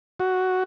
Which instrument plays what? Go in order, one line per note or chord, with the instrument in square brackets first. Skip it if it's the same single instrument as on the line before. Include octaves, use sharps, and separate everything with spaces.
[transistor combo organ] F#4